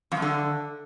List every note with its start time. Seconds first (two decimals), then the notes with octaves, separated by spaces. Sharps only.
0.12 F2
0.17 F#2
0.22 D3